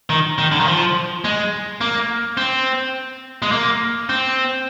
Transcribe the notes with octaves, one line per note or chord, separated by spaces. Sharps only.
D#3
D#3
D3
D#3
F3
G#3
A#3
C4
G#3
A#3
C4